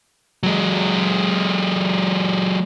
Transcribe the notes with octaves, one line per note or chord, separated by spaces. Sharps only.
F#3 G#3